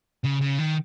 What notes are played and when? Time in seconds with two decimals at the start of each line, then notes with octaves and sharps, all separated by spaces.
0.24 C#3
0.41 C#3
0.58 D#3